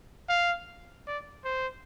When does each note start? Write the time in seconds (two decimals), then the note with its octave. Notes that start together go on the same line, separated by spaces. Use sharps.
0.29 F5
1.07 D5
1.44 C5